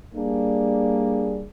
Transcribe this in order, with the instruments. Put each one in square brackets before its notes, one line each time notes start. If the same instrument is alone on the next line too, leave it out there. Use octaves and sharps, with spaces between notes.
[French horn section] G3 A#3 D4 G#4